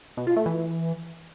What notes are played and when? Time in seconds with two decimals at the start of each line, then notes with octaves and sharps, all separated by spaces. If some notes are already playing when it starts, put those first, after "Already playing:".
0.17 B2
0.27 F4
0.36 A3
0.46 E3